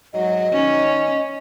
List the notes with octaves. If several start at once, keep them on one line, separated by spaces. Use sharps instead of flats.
G#2 F#3 D#5
D#3 C#4 D#4